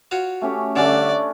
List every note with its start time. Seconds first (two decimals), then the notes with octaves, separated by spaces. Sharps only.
0.11 F4 F#4 C#5
0.41 A3 C#4 G4
0.76 G2 D3 A3 C#4 D4 D5